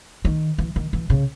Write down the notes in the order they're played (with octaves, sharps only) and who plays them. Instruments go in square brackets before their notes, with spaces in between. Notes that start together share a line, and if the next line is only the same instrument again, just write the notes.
[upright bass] D#3
E3
D#3
E3
C#3